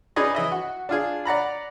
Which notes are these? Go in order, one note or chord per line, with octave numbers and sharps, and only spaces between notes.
C#4 D#4 G#4 B4 D5 D#5
E3 D#5 E5
F#4
D4 F4 G#4
D5 F#5 A#5 B5